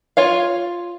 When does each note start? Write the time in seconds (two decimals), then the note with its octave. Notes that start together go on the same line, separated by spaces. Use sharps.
0.17 F4 C#5 F5